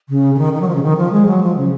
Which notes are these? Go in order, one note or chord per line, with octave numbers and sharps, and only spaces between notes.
C#3
C#3
D#3
D#3
F#3
F3
C#3
D#3
F3
G#3
F#3
F3
C#3